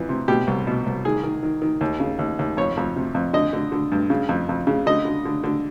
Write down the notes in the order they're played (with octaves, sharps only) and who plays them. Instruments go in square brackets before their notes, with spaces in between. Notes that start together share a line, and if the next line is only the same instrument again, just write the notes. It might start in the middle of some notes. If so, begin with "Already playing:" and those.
Already playing: [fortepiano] F2 E3
C3
B2 G4
C2
B2
C2
D#3 G#4
D#3
D#3
D#3
D#2
C#3
D#2
D#2
F2 C#5
F2
C3
F2
D3 D#5
D3
D3
G2
C#3
F2
F2
C#3
D3 D#5
D3
D3
D3